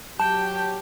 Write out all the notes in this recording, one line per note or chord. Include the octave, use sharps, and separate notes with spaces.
F#3 G4 G5 A5